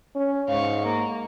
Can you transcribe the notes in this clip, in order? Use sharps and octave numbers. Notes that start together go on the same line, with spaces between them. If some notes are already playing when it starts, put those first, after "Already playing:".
C#4
G#2 F5 C#6
A#3